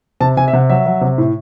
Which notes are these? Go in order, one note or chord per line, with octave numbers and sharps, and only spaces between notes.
C3 A5
C3 G#5
E5
C3 F#5
F#3 E5
F#3
C3
A2